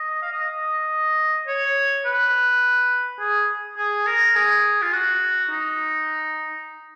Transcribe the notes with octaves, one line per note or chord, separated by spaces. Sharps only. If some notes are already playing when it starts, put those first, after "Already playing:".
Already playing: D#5
F5
D#5
C#5
B4
G#4
G#4
A#4
G#4
F4
F#4
D#4